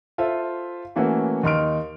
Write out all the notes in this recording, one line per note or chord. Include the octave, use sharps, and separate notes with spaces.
F4 A4 C5 E5
E3 A3 A#3 C#4 F#4
D#2 D#4 C6 F6 D7